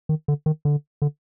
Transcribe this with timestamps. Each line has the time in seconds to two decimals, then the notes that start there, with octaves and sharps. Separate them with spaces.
0.09 D#3
0.28 D3
0.46 D#3
0.65 D3
1.02 D3